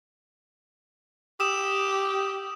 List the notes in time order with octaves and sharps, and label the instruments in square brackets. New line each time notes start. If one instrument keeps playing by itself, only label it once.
[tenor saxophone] G4 [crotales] D#6 E6 E7